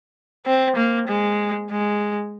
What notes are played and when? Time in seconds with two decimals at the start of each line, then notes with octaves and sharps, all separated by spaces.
0.46 C4
0.76 A#3
1.08 G#3
1.71 G#3